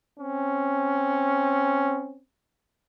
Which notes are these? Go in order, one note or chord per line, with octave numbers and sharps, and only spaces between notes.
C4 C#4